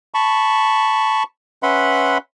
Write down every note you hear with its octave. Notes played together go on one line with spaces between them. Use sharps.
A5 B5 C#6
C#4 B4 E5 F#5 B5 C6